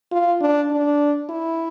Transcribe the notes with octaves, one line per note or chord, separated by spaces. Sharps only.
F4
D4
D4
E4